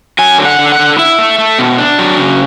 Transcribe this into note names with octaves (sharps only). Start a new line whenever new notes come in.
F#3 G#5
D3
F#5
D3
F#5
D3
E4 E5
A3
A3
B2
D4
F#3
C#3